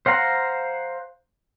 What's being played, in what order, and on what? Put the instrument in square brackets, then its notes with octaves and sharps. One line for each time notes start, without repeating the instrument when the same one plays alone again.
[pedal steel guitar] C5 F5 F#5 A#5 C6